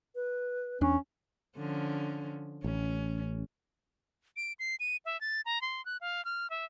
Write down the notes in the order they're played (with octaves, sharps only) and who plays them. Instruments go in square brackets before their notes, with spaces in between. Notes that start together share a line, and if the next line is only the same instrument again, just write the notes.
[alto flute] B4
[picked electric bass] E2 D4 [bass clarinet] C#4
[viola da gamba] D3 F3 C#4
[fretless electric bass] A1 [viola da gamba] C#4
[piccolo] D7
C7
D#7
E5
A6
A#5
C6
F#6
F5
F6
E5